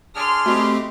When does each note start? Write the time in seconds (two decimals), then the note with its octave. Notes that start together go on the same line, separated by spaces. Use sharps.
0.15 D4 G#4 C6 F6
0.46 A3 C4 F#4 G4 D#5 B5